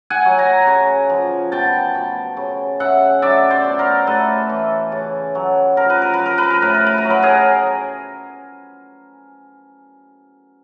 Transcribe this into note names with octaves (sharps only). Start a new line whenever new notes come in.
F#5 G#5
F#3
G#5 A#5
C#3
F3
B2 G5 A5
B2
C#3
C#3 E5 F#5
F#3 D5 E5
C5 D5
B2
A#4 C5
A2 A4 B4
E3
C#3
F#3
F3 A#4
B4
A#4
B4
F3
A#4
B4
A#4
A2 B4
A#4
B4
A#4
F#3
B4
G#4 A#4